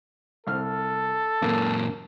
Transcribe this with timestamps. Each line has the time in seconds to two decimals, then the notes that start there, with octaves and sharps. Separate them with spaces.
0.47 C2 A4 F6
1.42 F#2 A#2 A#3